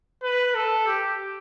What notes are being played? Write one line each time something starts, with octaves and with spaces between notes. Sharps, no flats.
B4
A4
G4